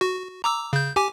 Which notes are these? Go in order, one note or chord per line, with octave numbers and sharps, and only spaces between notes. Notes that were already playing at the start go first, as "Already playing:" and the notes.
F#4
A#5 D6 E6
C#3 G6
G4 G#5 D6